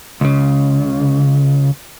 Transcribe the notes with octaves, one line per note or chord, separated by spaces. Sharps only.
C#2 C#3